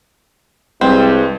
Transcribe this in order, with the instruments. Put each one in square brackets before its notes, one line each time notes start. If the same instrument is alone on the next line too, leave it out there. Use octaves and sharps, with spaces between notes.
[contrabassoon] C2 [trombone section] G2 [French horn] G#3 [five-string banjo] C4